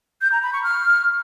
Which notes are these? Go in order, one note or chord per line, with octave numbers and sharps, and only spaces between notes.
G6
A#5
B5
C#6
F6